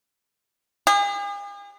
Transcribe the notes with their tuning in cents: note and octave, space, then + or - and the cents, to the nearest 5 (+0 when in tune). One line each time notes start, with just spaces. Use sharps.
G#4 -45